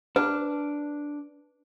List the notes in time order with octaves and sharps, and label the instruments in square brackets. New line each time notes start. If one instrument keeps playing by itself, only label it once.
[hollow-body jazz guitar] D4 [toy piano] B4